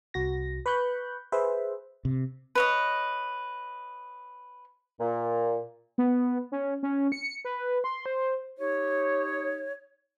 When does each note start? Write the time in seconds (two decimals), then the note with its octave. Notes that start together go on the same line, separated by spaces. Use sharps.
0.14 C2 F#4 A#6
0.66 B4 B5 C#6 F#6 G6
1.32 G#4 B4 C5 E5
2.05 C3
2.55 B4 C#5 D#5
5.00 A#2
5.98 B3
6.52 C#4
6.83 C#4
7.12 C#7
7.45 B4
7.84 C6
8.06 C5
8.59 D#4 G4 C#5